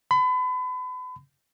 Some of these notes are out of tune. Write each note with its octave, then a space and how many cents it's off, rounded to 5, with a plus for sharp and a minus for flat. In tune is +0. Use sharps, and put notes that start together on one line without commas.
B5 +35